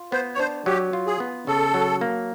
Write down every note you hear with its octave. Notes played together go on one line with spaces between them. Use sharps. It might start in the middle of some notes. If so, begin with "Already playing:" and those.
Already playing: F4
B3 C5
C#5
D4 C5
F#3 G4
F4
G#4
B3
C#3 A4
F#3
A#3